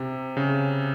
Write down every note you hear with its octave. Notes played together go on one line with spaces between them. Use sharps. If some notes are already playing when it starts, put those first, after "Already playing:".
Already playing: C3
C#3